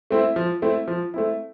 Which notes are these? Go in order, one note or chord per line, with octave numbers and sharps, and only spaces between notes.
A3 C4 E4
F3
A3 C4 E4
F3
A3 C4 E4